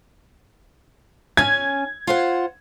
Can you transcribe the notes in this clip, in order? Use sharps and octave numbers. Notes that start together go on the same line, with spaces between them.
C#4 G#5 G#6
F4 C5 F#5